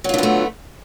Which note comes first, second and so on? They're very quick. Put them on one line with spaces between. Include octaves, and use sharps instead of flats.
F#3 F4 D3 B3 A3